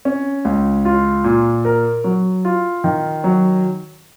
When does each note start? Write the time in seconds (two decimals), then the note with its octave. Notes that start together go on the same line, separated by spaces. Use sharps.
0.05 C#4
0.45 C#2
0.85 F4
1.24 A#2
1.65 A#4
2.04 F#3
2.45 F4
2.84 D#3
3.24 F#3